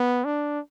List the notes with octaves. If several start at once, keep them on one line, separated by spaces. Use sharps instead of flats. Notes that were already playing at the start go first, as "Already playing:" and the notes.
Already playing: B3
D4